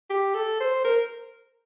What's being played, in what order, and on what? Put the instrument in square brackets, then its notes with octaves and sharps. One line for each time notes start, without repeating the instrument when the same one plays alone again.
[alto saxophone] G4
A4
C5
A#4